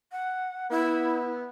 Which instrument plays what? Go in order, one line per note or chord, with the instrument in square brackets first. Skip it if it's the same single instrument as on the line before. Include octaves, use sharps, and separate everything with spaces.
[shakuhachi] F#5
[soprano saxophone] B3 [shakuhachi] E4